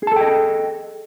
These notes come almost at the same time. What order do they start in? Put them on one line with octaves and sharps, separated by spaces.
G#4 A5 A4 G5 D#5